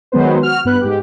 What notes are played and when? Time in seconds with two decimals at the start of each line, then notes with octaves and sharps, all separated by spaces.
0.12 D#3 F#3 G#3 B3 B4 C5
0.43 F#4 F6
0.65 G2 B3 B4 F#6
0.81 G#2 G4